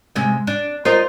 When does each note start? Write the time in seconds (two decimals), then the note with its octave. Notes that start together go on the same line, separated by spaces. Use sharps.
0.16 C3 G#3 E5
0.47 D4
0.85 D#4 F4 A#4 C5